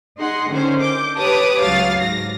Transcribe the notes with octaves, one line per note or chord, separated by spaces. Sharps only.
D#4 G#4 F#5 C6
D3 D#3 C#4 C5
D6 G6
G4 B4 C#5 A5 D6 D#6
C#2 F#3 F5 A6
G#2 A#6